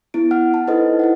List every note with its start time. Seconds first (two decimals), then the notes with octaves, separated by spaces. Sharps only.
0.14 B3 E4 D7
0.31 F#5 F6
0.54 A5
0.67 D#4 E4 A4 B4 C5 D#5
0.99 E4 D#5 F#5